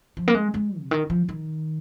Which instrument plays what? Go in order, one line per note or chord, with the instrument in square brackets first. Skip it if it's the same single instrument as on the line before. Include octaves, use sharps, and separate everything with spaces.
[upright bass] F3
A#3
G#3
G#3
C3
D#3
F3
D#3